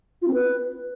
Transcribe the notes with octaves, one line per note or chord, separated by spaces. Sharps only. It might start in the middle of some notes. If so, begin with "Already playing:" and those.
F4
C4
B4